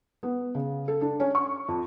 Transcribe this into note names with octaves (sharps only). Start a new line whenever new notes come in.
B3
C#3
A4
D4
C#4
C#6
F2